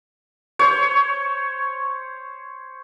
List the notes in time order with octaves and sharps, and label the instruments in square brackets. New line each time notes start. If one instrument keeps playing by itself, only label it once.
[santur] C5 C#5